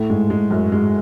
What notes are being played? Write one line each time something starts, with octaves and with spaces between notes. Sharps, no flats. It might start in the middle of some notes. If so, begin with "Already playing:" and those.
Already playing: A2 A3
G#2 G#3
G#2 G#3
F#2 F#3
G#2 G#3